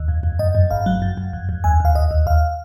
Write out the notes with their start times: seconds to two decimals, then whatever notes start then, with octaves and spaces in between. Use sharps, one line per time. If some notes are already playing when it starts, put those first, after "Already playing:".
Already playing: D#2
0.08 F2
0.23 F2
0.39 F#2 D#5
0.55 F#2
0.71 G#1 F5
0.86 F#3
1.02 F#2
1.17 F#2
1.33 F2
1.49 F2
1.64 D#2 G#5
1.80 D#2 F5
1.95 D#2 D#5
2.11 D#2
2.26 D#2 F5